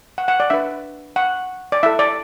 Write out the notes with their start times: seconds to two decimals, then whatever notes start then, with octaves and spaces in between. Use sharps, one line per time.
0.18 F#5
0.28 F#5
0.40 D5
0.50 D4 B4 E5
1.16 F#5
1.72 D5
1.83 E4 E5
1.86 A4
1.99 D5